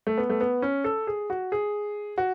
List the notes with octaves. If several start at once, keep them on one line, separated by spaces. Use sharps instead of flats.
A3
B3
A3
B3
C#4
A4
G#4
F#4
G#4
F#4